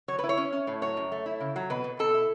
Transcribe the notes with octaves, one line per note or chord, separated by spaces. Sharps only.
F#3 C#5
E4 B4
C#5
C#4
C#4
A2
F#3 C#5
F#2
A3
E4
C#3
F#3
B2 B4
B2
B2 A4
E4